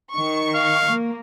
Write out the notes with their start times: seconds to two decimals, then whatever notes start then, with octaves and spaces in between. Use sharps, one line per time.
0.13 D#3 C#6
0.55 F5
0.92 A#3